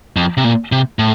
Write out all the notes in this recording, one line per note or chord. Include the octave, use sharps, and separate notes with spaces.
F2
C3
A#2
C3
A2